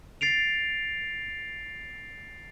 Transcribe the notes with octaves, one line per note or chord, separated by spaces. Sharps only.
A6 C7 D7 F7